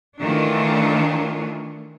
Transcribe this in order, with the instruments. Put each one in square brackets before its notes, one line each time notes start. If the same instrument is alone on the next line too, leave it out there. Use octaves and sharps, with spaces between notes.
[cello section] D#3 E3 A3 D4 F4 C#5